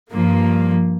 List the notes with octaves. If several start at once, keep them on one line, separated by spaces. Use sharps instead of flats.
G2 F3 A#3